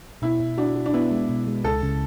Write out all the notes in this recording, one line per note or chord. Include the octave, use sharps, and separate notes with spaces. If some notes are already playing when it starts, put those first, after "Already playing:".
B2 E4
B2
D4 F#4
F#4
D4
B3 E4
G#3
B2
G#3
C#2 A4
C#3